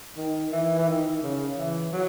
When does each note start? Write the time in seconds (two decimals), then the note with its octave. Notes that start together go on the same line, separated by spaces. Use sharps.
0.17 D#3
0.52 E3
0.79 E3
0.87 D#3
1.23 C#3
1.57 E3
1.93 F#3